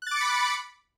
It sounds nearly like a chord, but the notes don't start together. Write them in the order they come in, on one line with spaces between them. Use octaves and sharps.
F#6 A6 D6 C#7 B5